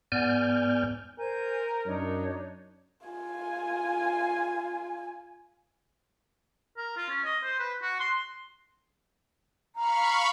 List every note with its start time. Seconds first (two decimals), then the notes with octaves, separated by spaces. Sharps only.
0.12 G#2 B3 D5 G#5 F6 G6
1.19 A#4 C5 G#5 G6
1.86 F#2 D4 D#4 C#5
3.07 F4 G#5
6.77 A#4
6.97 F4
7.09 C#4
7.25 D#5
7.43 C5
7.59 B4
7.82 F#4
8.00 C6
9.76 F5 A#5 B5 C#6